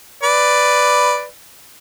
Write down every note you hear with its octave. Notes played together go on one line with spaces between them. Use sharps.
B4 D5